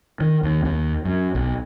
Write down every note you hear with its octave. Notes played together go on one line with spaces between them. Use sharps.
D#3
D#2
D#2
F#2
B1